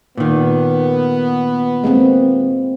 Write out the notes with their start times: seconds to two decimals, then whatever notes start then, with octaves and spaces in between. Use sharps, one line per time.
0.17 A#2 D#3 B3
1.84 G#3 A#3 C4